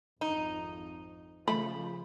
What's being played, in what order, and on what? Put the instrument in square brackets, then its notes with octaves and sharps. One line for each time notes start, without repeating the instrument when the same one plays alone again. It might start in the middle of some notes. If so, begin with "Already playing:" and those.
[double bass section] G#1 F2 [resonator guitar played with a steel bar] D#4
[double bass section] C#3 F3 [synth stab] A3 [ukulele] B5